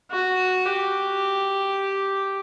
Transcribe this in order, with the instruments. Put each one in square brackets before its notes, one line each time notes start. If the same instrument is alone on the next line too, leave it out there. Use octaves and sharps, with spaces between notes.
[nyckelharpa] F#4
G4